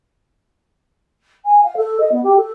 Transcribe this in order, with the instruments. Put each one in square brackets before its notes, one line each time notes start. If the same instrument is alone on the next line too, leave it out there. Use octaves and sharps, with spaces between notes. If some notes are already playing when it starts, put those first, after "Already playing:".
[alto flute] G#5
F5
A4
D#5
B3
G4
A4